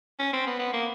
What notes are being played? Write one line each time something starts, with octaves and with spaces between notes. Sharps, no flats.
C#4
C4
B3
B3
A#3